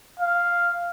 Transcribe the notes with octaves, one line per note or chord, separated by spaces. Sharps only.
F5